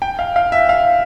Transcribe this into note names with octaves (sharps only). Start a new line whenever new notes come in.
G5
F5
F5
E5
F5